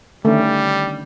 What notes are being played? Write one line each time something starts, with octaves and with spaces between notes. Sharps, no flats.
D3 D#3 G3 A3 C#4